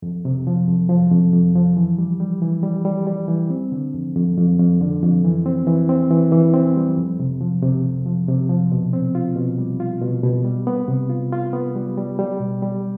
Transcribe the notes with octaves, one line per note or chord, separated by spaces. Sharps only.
F2
C3
F3
F2
F3
F2
F2
F3
E3
G3
G3
E3
G3
G3
G3
E3
C4
D3
F2
F2
F2
F2
D3
F2
E3
C4
E3
C4
E3
E3
C4
G3
F2
C3
F3
C3
F2
F3
C3
F3
B2
C4
F4
B2
G3
F4
B2
B2
G3
B3
C3
F4
F4
B3
G3
G3
G3
B2
G3